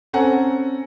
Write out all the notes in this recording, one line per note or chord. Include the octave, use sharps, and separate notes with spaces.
C4 C#4 A4 F#5 G#5 A#5